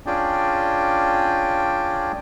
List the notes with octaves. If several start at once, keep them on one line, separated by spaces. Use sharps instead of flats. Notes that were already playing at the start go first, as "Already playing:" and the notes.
C#4 D4 F4 G#4 D5 G5